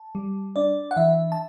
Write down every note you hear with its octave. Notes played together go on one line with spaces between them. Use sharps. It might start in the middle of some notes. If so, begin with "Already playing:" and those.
Already playing: A5
G3
D4 D5
F#5
E3 E5
A5